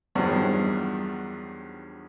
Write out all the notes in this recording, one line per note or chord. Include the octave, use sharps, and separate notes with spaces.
E2 G2 D#3 F3 F#3